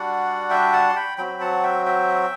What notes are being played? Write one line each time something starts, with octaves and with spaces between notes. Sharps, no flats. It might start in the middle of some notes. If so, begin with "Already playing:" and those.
Already playing: G3 D4 F#4 D5 F#5
E5 G5
F#5 A5
C6
G5 B5
F#3 C4 F#4 G5 B5
F#5 A5
E5 G5
E5 G5